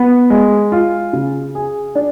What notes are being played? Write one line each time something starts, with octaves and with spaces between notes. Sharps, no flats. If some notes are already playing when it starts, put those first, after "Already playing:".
Already playing: B3
G#3
F4
C#3
G#4
D4